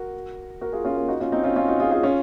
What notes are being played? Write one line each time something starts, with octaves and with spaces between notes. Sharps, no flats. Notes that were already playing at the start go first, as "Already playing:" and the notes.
Already playing: F#4 A#4
F#4 A#4
F4 G#4
C#4 F4
A#3 C#4
D#4 F#4
C#4 F4
C4 D#4
C#4 F4
C#4 F4
D#4 F#4
F4 G#4
F4 G#4
C#4 F4